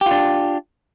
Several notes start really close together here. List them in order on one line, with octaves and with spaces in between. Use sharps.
G4 F4 D4